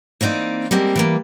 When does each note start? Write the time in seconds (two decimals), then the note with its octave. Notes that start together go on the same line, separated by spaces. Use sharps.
0.21 E3 A#3 C4 D#4 D5
0.71 G3 G#3 A#3 C4
0.96 E3 G3 A#3